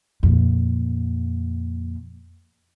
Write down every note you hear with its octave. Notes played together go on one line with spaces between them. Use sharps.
F2 A#2